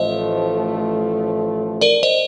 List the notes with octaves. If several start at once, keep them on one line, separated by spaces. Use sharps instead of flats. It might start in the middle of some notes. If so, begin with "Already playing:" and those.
Already playing: A1 A2 F3 A3 C5 D#5
A#4 D5
C5 D#5